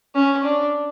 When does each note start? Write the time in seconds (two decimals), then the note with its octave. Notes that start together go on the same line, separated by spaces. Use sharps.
0.15 C#4
0.43 D4